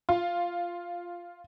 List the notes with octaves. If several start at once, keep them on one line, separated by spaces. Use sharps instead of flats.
F4